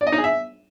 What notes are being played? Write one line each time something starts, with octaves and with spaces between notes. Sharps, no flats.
D5
D#5
D#4
G#4
E5